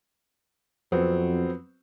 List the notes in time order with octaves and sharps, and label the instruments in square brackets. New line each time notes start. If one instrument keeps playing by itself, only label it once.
[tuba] F2 [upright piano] F#3 B3 C4